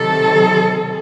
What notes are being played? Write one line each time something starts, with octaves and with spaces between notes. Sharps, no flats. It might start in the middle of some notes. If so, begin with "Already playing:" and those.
Already playing: C3 D#3 F#3 A4